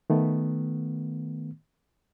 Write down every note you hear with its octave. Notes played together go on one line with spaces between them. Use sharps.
D#3 A3 B3